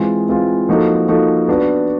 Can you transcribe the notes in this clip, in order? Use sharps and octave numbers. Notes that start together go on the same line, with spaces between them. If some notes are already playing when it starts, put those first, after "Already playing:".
Already playing: E3 G#3 C4 F4
E3 G#3 C4 F4
F3 A#3 D#4 F#4 A4
F3 A#3 D#4 F#4 A4
B3 D4 F#4 B4 D5